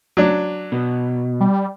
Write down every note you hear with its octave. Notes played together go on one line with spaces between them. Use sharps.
F#3 D4
B2
G3